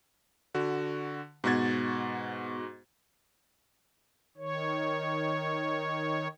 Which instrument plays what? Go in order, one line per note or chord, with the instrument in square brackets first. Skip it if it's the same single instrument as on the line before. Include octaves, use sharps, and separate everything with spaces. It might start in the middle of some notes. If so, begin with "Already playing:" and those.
[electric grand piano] D3 F#4
[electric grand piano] G#2 F#4 A6 [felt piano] B2 G#6
[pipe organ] D#3 C#5